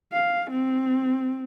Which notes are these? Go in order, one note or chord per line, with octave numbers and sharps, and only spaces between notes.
F5
C4